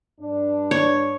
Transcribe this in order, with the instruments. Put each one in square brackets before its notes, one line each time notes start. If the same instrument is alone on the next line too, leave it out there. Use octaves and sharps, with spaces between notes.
[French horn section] G2 D4
[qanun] C#5